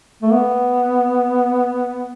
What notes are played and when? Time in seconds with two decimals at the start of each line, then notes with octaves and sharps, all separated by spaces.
0.22 A3
0.32 B3